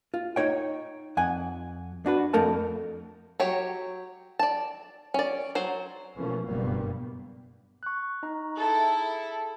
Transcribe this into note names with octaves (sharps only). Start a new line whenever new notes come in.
F4
D#4 C#5 G5
F2 F#5 G#5
D4 F#4 B4
F2 A3 A4 A#4 A5
F#3 G4 C#5
D5 A5
C#4 D5
F#3 C5
B2 E3 F3 A3 A#3 C#4
F#1 G2 B2 G3 A#3 B3
C#6 F#6
D#4 D#5 A#5
E4 G#4 A4